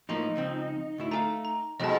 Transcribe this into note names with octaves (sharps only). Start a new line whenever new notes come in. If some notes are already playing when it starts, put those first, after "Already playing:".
A2 F3 A#3 D#4
C#2 F3 C4
D2 A2 E4
A3 G#4 F5 A#5
A#5
F2 G#2 B2 D#5 A5